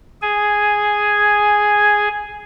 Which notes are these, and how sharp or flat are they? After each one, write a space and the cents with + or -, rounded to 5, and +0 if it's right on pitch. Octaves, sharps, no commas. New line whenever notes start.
G#4 +0 G#5 +0